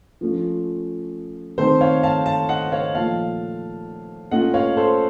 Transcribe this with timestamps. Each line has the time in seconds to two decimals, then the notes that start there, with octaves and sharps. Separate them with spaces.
0.21 F3 A3 C#4 F4
1.58 D#3 A3 C4 D#4 A4 C5
1.81 C#5 F5
2.03 F5 A5
2.26 F5 A5
2.49 D#5 F#5
2.72 C#5 F5
2.95 A#2 F3 A3 F5 A5
4.31 A#2 A3 C#4 F4 D#5 F#5
4.54 C#5 F5
4.77 A4 C5